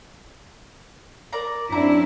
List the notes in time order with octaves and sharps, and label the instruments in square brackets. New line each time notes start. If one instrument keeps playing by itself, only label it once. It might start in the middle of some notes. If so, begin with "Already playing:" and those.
[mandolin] A#4 D5 A#5
[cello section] F#2 C4 E4 [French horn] D4 [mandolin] A#5